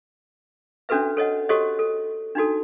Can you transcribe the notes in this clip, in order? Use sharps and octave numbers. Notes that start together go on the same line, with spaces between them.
C#4 D4 F#4 A4 B4 E5
A4 C#5 D#5 F#5
F#4 G4 A4 C5 C#5 D#5
A4
D4 D#4 F#4 A4